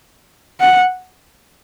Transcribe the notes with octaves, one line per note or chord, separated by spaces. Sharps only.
F#5